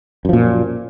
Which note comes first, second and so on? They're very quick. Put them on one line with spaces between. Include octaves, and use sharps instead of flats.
F#2 F3 A#2